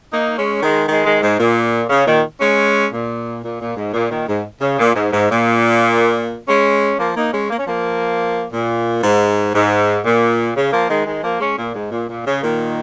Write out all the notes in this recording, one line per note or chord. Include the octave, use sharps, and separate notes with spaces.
A#3 D#4
G#3 C#4
D#3 G#3
D#3 G#3
D#3 G#3
G#2
A#2
C#3
A#2 D#3
G#3 C#4
A#2
A#2
A#2
G#2
A#2
A#2 D#3
G#2
C#3
A#2
G#2
G#2
A#2
G#3 C#4
F3 A#3
A#3 D#4
G#3 C#4
A#3
C#4
F3 A#3
A#2
G#2
G#2
A#2
C#3
F3 A#3
D#3 G#3
D#3 G#3
F3 A#3
G#3 C#4
A#2
G#2
A#2
A#2
C#3
A#2 D#3